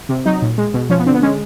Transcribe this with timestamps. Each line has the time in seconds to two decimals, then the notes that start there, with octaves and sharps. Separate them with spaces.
0.09 C3
0.26 F#3 D#4
0.42 A#2
0.58 G#3
0.74 B2
0.90 F3 C#4
0.99 B3
1.06 D3 C4
1.14 B3
1.22 G#3 C#4